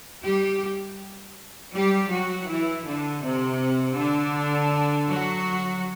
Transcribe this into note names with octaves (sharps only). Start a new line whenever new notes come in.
G3 G4
G3 G4
F#3 F#4
E3 E4
D3 D4
C3 C4
D3 D4
F#3 F#4